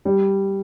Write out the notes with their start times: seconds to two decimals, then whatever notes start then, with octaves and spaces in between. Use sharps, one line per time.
0.05 G3